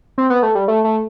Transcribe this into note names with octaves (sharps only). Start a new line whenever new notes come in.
C4
B3
A3
G3
A3
A3